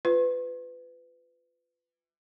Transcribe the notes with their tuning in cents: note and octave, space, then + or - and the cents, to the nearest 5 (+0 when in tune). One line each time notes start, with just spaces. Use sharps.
F4 +0 B4 +20